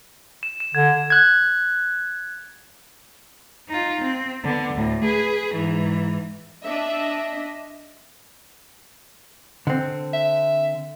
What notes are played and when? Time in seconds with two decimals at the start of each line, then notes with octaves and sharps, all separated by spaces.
0.43 E7
0.60 E7
0.75 D3 G#6
1.10 F#6 G#6
3.68 D#4 F4
4.01 C4
4.44 D3 B3
4.74 D2 A2
5.04 G#4 B4
5.55 G#2 E3
6.64 D4 D#5 E5
9.67 D3 C4
10.13 E5